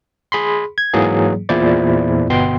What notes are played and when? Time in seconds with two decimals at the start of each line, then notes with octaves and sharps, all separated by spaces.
0.32 G#4 B5 C6
0.78 G#6
0.93 G#2 E3 F#3 A#3 G#4
1.49 E2 A#2 E4 F4 C5 D5
2.30 G1 B2 B3 G5 C6